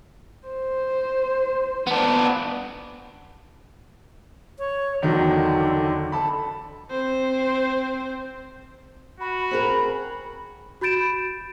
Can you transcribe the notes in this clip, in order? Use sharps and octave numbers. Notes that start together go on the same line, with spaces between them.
C5
B3 D4
C#5
E2 D3 D#3 F#3
A4 A5 B5
C4 C5
F#4 B5
C4 G#4 A#4
F#4 B5 G6 A6 D7 E7